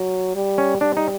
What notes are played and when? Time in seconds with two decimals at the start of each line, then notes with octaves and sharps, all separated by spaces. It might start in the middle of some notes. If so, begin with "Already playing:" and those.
Already playing: F#3
0.35 G3
0.58 C#4
0.81 G3 D4
0.97 D#4